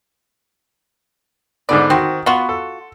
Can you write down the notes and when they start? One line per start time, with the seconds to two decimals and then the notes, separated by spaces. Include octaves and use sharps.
1.69 G#2 D3 B3 D5
1.90 D#3 C4 F#4
2.26 B3 F4 F#4
2.49 A4